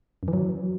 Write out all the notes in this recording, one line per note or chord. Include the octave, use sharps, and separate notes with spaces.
F#2
E3
F#3